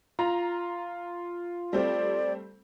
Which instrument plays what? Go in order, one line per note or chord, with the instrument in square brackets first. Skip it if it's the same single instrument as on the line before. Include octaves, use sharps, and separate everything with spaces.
[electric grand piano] F4 [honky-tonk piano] A#5
[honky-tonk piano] G3 A3 C4 [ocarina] D5